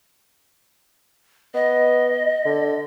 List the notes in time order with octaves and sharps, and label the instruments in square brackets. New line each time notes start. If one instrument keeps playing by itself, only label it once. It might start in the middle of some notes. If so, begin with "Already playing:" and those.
[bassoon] B3 [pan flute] D#5
[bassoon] D3